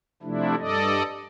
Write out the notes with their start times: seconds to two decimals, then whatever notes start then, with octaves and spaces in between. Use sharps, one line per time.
0.23 C3 F3 A3 D4 E4
0.58 G2 A4 D5 D#5